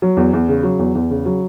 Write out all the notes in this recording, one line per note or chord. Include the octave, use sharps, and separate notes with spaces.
F#3
E2
E2
C#3
F#3
E2
E2
C#3
F#3